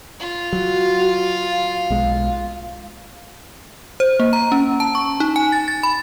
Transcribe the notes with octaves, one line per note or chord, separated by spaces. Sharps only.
F4
F#3 F#4
F5
B1 G#3
C5
A#3
A#5
C#4
A5
C#6
D#4
G#5
A6
A6
B5